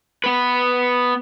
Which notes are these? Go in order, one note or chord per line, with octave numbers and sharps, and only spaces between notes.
B3 B4